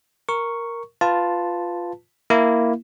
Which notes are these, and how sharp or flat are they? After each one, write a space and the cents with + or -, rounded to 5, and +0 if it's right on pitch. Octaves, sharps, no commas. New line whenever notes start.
A#4 +0 C#6 +0
F4 +0 B4 +10 A5 +0
A#3 +0 E4 +0